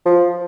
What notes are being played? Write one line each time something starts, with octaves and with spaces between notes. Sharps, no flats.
F3